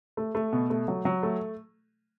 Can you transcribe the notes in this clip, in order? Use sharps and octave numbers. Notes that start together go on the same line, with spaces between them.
A3
A3
B2
A3
F#3
F#3
A3